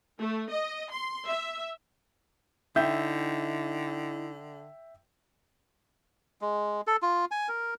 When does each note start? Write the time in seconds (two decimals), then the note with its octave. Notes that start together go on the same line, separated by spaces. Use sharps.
0.20 A3
0.50 D#5
0.92 C6
1.28 E5
2.76 D3 D#4 E4 E5 G5 G6
6.41 G#3
6.87 A4
7.02 F4
7.31 G#5
7.49 A#4